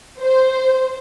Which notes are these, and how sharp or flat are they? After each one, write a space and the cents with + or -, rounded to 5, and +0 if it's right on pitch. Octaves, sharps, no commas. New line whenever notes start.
C5 -5